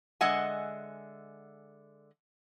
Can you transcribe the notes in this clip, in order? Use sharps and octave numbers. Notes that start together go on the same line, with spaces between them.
D3 G#3 D#5 E5 F#5 G#5